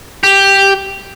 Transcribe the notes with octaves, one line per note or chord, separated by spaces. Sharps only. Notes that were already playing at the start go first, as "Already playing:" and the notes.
G4